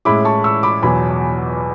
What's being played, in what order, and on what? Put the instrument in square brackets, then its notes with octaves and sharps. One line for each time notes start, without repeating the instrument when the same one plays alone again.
[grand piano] A2 G#3 C#4 E4 [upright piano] B5 D6
[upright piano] A5 C#6
C#6 E6
B5 D6
[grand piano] E2 B2 F#3 [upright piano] G#5 B5